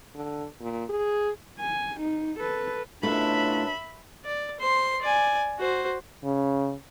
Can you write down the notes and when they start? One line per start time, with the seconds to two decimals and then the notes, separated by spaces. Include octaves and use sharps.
0.15 D3
0.61 A#2
0.89 G#4
1.61 G#5
2.01 D#4
2.40 A4 B4
3.03 F#2 B2 A3 D4 E4 F4 E5 B5
4.25 D5
4.60 C5 C6
5.02 D5 G#5
5.59 F#4 C5
6.24 C#3